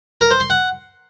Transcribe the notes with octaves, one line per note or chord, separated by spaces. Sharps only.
A#4
C5
C6
F#5